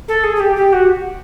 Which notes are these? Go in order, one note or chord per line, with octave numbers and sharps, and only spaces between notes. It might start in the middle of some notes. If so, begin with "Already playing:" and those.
A4
G#4
G#4
G4
G4
F#4